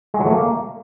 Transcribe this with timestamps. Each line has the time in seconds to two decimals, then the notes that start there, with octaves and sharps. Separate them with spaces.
0.14 G#3
0.20 F#3
0.26 A3
0.33 A#3